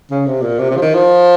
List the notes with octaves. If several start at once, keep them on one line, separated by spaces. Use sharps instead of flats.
C#3
C3
A#2
C3
C3
F3
D#3
F3